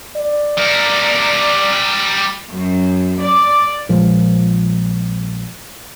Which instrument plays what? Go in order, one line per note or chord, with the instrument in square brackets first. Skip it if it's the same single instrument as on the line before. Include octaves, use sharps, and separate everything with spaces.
[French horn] D5
[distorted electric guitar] G3 A#4
[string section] F#2
D5
[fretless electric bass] A#1 A#2 F3 G#3